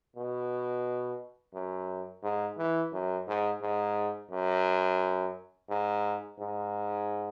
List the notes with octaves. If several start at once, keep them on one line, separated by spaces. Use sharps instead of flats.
B2
F#2
G#2
E3
F#2
G#2
G#2
F#2
G#2
G#2